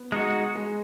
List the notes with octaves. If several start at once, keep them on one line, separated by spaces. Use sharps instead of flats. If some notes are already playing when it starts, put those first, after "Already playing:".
Already playing: B3
G#3 D#4 F#4
G#3